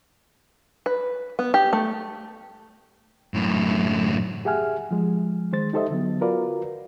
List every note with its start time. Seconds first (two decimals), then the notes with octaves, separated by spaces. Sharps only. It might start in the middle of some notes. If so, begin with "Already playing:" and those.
0.86 B4
1.39 B3
1.54 G4
1.73 A3
3.34 F#2 A2
4.45 G4 G#4 E5 F#5 G#5 F6
4.91 F3 G#3
5.52 D#3 G#3 C5 A6
5.73 D#4 G4 A4 C5 D#5 E5
5.91 D3 F#3 B3
6.21 F4 F#4 A#4 B4 D5 F5